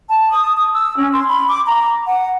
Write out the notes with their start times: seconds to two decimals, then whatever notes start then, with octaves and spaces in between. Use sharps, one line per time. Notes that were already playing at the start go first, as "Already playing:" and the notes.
0.09 A5
0.31 D#6
0.58 D#6
0.74 E6
0.98 C#4
1.12 C6
1.28 B5
1.49 D6
1.65 A#5
2.07 F#5